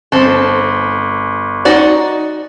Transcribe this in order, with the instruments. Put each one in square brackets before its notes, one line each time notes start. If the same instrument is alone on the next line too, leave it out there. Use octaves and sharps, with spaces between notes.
[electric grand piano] G1 [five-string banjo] C4 A4
[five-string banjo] D#4 F#4 D5